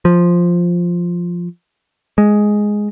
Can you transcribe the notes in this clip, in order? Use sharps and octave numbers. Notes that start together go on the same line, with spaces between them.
F3
G#3